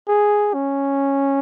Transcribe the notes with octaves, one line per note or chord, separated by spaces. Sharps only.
G#4
C#4